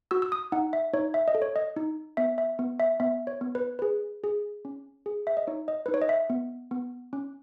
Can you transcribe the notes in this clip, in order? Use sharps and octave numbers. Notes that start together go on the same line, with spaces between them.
F#4 E6
E6
D#6
D#4 F#5
E5
D#4 C#5
E5
D#5
A4
C#5
D#5
D#4
B3 E5
E5
B3
E5
B3 E5
C#5
B3
B4
G#4 B4
G#4
C#4
G#4
E5
D#5
D#4 C#5
D#5
D#4 B4
C#5
D#5
E5
B3
B3
C#4